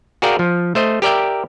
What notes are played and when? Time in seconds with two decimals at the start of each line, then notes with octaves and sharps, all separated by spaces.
0.22 F#4 G#4 A#4 D5 F5 G5
0.39 F3
0.75 A3 C5 D#5
1.02 G4 A#4 D5 E5 G5